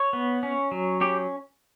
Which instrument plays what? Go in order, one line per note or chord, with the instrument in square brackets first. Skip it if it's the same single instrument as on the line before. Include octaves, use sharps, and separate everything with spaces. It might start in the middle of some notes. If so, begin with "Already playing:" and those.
Already playing: [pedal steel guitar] C#5
B3
C#4
F#3
C#4 G4